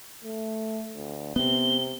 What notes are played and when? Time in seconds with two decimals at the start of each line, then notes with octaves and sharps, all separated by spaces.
0.24 A3
0.95 D2
1.36 C3 B3 C4 G7